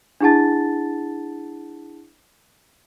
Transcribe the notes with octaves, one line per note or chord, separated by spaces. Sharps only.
D4 E4 G#4 F#5 A5 A6